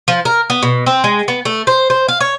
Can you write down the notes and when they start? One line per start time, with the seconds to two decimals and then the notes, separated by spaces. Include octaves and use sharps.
0.08 F3
0.25 A#4
0.50 B3
0.63 B2
0.86 C4
1.04 G#3
1.28 B3
1.45 A3
1.67 C5
1.90 C5
2.08 F5
2.21 C#5